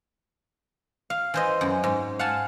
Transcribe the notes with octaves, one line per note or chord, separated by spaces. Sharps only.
F5
E3 C5 D#5
F#2
G#2
F5 F#5 G#5 A5